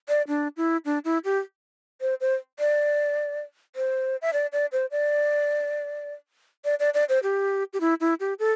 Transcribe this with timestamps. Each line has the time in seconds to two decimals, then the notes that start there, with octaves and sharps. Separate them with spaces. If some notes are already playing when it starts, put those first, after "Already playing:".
0.09 D5
0.28 D4
0.57 E4
0.85 D4
1.05 E4
1.25 G4
2.01 C5
2.21 C5
2.59 D5
3.76 C5
4.22 E5
4.33 D5
4.52 D5
4.72 C5
4.91 D5
6.65 D5
6.80 D5
6.94 D5
7.09 C5
7.23 G4
7.73 G4
7.81 E4
8.01 E4
8.20 G4
8.39 A4